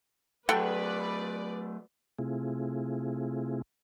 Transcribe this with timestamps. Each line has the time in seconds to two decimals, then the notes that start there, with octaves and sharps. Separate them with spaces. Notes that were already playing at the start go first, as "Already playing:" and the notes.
0.49 F#3 A3 A4 B4 D5 F#5 G5
2.19 C3 A3 C4 E4 F4 G#4